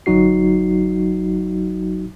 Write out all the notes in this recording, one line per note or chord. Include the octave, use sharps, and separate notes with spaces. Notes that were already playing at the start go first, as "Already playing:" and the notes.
G1 F#3 D#4 F#4 C7